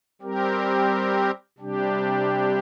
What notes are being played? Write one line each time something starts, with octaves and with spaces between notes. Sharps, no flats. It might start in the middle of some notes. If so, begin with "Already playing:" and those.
G3 C4 G4 A#4
C3 G3 D4 G4